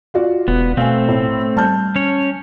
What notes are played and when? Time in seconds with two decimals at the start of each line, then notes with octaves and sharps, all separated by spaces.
0.14 F4 F#4 D5
0.48 E1 B3
0.77 B2 A3 C4 F5 G#5
1.08 A2
1.57 G3 A5 F6 G6
1.96 C#4 C#5